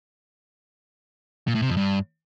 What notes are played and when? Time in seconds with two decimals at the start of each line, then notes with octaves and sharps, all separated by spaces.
1.47 A#2
1.55 A2
1.62 C3
1.70 F2
1.77 G2